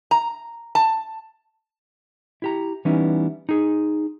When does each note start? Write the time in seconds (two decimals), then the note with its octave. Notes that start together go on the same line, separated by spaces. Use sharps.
0.11 A#5
0.75 A5
2.42 E4 G4 A#5
2.85 E3 G3 B3 C#4 D#4 E4
3.49 D#4 G#4